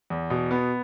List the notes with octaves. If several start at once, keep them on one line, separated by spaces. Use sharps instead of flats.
E2
B2
B3